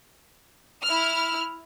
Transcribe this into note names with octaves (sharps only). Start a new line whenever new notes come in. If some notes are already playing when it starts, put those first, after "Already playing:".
E4 F6